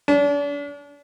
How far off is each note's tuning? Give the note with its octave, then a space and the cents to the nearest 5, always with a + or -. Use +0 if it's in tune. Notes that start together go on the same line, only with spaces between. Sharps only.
D4 -40